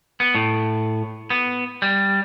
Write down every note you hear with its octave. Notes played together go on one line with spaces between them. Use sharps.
B3
A2
B3
G3